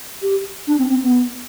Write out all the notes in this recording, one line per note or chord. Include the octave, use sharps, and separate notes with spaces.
G4
D4
C4
C4
B3